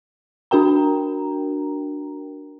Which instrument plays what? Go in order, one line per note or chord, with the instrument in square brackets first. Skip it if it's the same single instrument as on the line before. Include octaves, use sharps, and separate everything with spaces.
[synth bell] D4 F#4 A#4 G5 A#5